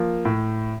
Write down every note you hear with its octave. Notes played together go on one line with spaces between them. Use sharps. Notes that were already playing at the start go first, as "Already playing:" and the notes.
Already playing: F3 A#3
A2